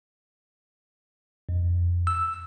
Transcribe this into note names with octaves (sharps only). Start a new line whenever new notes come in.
F2
E6